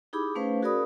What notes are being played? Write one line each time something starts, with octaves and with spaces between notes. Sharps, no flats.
D#4 E4 G4 G#4 B5 D6
A3 C#4 B4 C5 F5
F#4 G#4 A#4 D5 B5 D#6